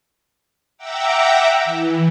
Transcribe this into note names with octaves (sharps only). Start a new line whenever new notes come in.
E5 F#5 G5 A#5 D6 E6
E3